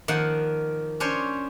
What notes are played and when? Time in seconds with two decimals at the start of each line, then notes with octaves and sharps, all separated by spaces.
0.08 D#3 F3 A#3 F#5
1.00 C#4 D4 C5 C#5